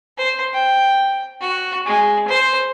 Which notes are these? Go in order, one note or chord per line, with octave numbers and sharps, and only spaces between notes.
C5
G5
F#4
G#3
C5